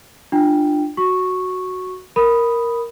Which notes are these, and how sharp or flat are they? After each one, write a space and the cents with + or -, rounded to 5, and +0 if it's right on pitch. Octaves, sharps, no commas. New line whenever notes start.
D4 +25 F4 +0 G5 +0
F#4 +0 C#6 -5
A#4 +0 B5 +0 D#6 +0